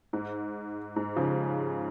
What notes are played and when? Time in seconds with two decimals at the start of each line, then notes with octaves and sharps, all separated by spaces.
0.13 G#2
0.96 G#2
1.16 C#3 F3